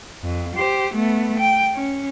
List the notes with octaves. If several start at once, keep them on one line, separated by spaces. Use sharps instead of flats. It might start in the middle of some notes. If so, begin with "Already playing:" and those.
F2
G4 C5
A3 B3
G5
C#4